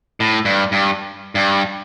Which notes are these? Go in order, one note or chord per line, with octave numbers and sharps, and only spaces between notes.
A2
G2
G2
G2